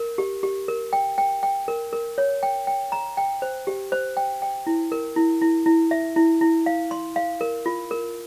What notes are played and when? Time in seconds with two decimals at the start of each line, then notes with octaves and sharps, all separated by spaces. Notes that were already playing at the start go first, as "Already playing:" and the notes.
Already playing: A#4
0.18 G4
0.43 G4
0.68 A#4
0.93 G5
1.18 G5
1.43 G5
1.68 A#4
1.93 A#4
2.18 C#5
2.43 G5
2.67 G5
2.92 A#5
3.17 G5
3.42 C5
3.67 G4
3.92 C5
4.17 G5
4.42 G5
4.67 E4
4.92 A#4
5.16 E4
5.42 E4
5.66 E4
5.91 E5
6.16 E4
6.41 E4
6.66 F5
6.91 C6
7.16 F5
7.41 A#4
7.66 F4
7.91 A#4